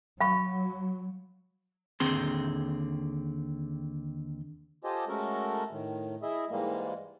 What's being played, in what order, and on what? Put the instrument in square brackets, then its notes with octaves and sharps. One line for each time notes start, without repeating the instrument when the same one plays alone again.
[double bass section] F#3 [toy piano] F5 B5 C#6
[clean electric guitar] D#2 D3 C4 G#4 C6
[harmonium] F4 G4 A4 C5 D#5 G#5
G#3 A3 C#4 F#4 A4 A#4
A2 D#3
E4 G#4 D#5 E5
G#2 E3 G3 G#3 A#3